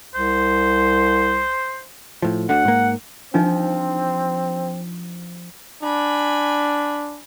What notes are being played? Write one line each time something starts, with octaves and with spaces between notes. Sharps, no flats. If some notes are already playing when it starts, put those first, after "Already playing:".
C2 C5
A2 F3
D2 D3 F#5
G#2 A#3
F3 C4 D4 D#4
D4 G#5 B5